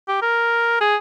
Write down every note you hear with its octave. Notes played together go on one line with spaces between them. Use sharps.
G4
A#4
G#4